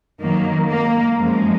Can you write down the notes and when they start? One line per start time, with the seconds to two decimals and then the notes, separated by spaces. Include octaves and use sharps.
0.21 F#2 D#3 F#3 A#3
0.69 A#3
1.16 F#2 F3 G#3